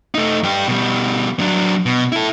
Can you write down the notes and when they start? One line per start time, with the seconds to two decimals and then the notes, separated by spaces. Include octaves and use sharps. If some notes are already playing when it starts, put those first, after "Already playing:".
0.15 A3 D#4
0.43 G2 G4
0.68 B2 G3
1.40 F#3 D4
1.86 B2
2.12 E4 A4